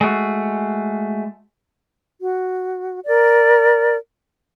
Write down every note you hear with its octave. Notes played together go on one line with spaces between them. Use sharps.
G#3 A3 F#4
F#4
A#4 D5